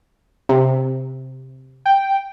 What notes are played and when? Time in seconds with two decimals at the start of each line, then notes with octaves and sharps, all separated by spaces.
0.49 C3
1.85 G5